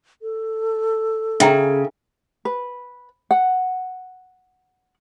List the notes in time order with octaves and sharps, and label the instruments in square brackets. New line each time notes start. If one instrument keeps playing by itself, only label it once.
[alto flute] A4
[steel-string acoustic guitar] C#3 [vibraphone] G#4 [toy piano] E5 G5 A#5
[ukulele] B4
F#5